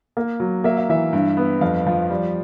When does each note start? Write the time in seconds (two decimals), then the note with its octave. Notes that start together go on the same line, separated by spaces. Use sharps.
0.17 A#3
0.40 F#3
0.64 A#3 E5
0.77 F5
0.89 E3 E5
1.13 G2
1.37 B3
1.61 F2 F5
1.87 F3
2.10 G3